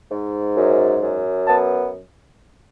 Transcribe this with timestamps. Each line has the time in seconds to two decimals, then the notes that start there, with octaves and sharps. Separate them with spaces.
0.11 G#2
0.57 F#2
1.02 F#2
1.47 B3 A5